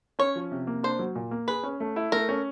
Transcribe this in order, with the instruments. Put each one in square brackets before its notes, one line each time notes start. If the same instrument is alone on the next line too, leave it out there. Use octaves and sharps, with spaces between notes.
[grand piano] C#4 [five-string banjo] C#5
[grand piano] F3
C3
A#3
[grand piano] D4 [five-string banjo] C5
[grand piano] F#3
A#2
A#3
[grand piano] G#4 [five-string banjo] B4
[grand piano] C#4
A3
E4
[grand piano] A3 [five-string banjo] A#4
[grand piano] C#4